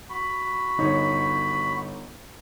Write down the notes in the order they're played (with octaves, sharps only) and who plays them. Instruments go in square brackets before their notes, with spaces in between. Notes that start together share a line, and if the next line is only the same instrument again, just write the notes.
[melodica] F#4 B5
[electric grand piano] G1 D#4 C#5